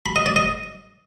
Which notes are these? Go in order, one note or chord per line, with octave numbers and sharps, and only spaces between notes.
B5
D#5
D5
D#5